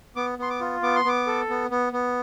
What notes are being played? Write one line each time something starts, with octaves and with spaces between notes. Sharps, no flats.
B3 D6
B3 C6
D6
F4
B3 D6
C6
B3 D6
A4
B3
B3
B3